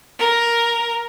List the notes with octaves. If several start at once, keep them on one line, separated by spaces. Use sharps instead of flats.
A#4